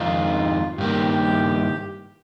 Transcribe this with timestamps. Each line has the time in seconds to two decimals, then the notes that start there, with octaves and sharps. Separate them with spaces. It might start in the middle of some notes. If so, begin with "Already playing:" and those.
Already playing: F2 D#3 G#3 D#4 F4
0.78 G2 D#3 A#3 G4